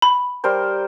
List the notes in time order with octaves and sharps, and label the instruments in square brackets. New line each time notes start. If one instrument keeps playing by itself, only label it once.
[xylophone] B5
[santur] G3 A#4 C5